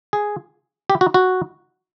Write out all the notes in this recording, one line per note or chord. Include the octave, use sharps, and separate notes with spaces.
G#4
G4
F#4
F#4